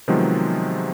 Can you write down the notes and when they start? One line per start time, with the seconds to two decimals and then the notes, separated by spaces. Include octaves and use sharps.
0.08 C3 D#3 F3 F#3 G#3 B3